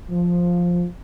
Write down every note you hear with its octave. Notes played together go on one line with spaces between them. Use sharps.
F3